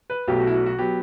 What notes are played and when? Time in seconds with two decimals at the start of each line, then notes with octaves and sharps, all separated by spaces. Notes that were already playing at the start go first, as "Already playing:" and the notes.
0.10 B4
0.28 B1 B2 F#3 A3 G4
0.40 F#4
0.47 E4
0.54 F#4
0.66 F#4
0.78 F#3 B3 G4